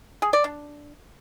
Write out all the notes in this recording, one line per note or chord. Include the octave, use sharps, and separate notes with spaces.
G#4
D5
D4